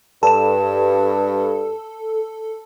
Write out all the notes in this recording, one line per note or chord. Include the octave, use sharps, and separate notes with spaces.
G2 A4 A5 E7